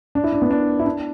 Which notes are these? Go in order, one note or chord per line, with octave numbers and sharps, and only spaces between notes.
D4
E4
D4
B3
D4
E4
D4